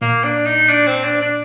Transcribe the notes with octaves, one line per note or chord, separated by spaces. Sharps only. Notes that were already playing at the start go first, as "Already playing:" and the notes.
A#2 A#3
D4
D#4
D4
C4
D4
D4